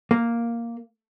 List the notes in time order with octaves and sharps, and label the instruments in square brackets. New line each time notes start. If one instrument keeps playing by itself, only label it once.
[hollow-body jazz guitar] A#3